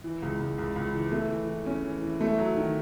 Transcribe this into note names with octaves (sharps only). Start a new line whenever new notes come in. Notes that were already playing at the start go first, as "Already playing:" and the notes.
E3
C#2
C#2
C#2
C#2
E3
A3
E3
E3
C#4
E3
E3
A3
F#3
D#3